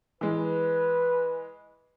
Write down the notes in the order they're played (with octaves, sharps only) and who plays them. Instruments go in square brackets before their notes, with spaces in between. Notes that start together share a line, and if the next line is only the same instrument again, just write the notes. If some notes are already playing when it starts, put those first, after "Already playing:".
[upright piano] E3 G#3 [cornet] B4